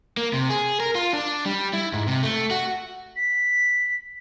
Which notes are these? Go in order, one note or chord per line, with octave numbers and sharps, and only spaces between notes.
A#3
C3
G#4
A#4
F4
D4
G3
E4
G#2
C3
A3
F#4
B6